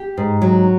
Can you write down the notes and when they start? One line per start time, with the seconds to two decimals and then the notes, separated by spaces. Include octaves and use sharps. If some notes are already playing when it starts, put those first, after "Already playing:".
Already playing: G4
0.18 G#2
0.42 F#3